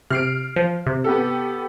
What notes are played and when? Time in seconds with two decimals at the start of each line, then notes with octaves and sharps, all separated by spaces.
0.10 C3 F6 C7 D7
0.56 F3
0.86 C3
1.04 B3 G4 A4